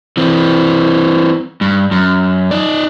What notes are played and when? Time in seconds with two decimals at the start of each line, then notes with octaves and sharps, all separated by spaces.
0.17 E3 C4
1.61 G2
1.91 F#2
2.51 D#4 D5